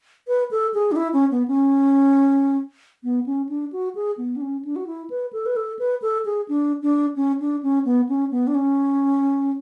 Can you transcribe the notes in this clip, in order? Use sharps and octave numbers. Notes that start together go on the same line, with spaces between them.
B4
A4
G#4
D4
E4
C#4
B3
C#4
B3
C#4
D4
F#4
G#4
B3
D4
C#4
D4
F#4
E4
B4
A4
B4
A4
B4
A4
G#4
D4
D4
C#4
D4
C#4
B3
C#4
B3
D4
C#4